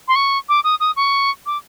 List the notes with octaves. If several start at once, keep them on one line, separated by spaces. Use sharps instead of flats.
C6
C#6
D6
D#6
D#6
C#6
D6